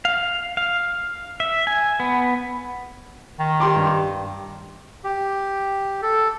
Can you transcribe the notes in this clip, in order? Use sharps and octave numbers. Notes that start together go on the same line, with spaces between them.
F5
F5
E5
G#5
B3
D#3
G4 C6 D6
G2
G4
A4